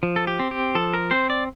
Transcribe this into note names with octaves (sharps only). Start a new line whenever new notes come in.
F3
A4
G4
C4
G4
F3 A4
A#4
C4 C5
D5